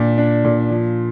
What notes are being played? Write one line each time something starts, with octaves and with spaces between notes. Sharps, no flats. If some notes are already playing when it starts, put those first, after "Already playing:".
Already playing: A#2 D4
D4
A#2
F3